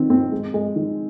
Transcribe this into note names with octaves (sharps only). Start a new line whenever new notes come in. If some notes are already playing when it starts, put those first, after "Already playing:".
Already playing: D#3 C4
C4
G#3
G#3
D#3